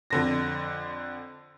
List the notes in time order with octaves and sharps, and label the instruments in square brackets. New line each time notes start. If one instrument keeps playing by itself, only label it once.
[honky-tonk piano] F2 D3 A#6